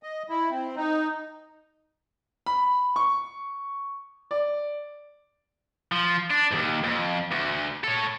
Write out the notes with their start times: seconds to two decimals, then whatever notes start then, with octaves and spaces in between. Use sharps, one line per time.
0.03 D#5
0.29 E4
0.50 C4
0.76 D#4
2.46 B5
2.96 C#6
4.31 D5
5.92 F3
6.30 D4
6.51 D#2 G#2
6.84 F2
7.31 D2
7.84 A4 C#5